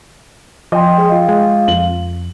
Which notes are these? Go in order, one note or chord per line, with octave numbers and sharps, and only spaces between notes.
F3 D#5 G5 C6
G#3
F4
G#3
F2 F#7